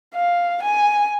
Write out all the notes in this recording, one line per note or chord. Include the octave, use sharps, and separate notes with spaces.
F5
G#5